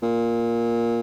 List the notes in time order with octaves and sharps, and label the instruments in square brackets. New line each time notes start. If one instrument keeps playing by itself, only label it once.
[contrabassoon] A#2